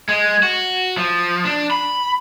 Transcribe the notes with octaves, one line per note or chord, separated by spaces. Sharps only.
G#3
F#4
F3
D4
B5